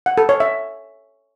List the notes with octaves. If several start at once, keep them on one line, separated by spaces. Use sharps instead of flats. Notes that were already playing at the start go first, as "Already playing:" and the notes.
F#5
A4
C#5
E5